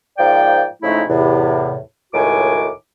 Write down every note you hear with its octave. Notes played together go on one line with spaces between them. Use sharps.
G#2 F3 A#3 D5 G5
F2 C#3 G#3 A3 D#4 E4
E2 A2 C3
C#2 A2 D#3 F#4 G#5 D6